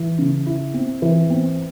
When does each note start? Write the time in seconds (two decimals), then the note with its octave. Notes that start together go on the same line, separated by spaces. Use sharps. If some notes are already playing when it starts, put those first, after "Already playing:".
Already playing: E3
0.19 C#3
0.46 E4
0.74 C4
1.02 E3
1.30 C4